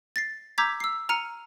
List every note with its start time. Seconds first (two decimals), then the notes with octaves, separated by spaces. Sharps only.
0.16 A6 A#6 C7
0.58 A#5 D6 E6 G6 G#6 B6
0.80 E6 C7
1.09 A#5 F6 C#7 D#7